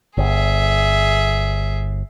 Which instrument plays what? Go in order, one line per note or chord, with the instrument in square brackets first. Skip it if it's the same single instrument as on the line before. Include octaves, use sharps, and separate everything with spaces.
[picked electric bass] G1 [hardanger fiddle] G#4 E5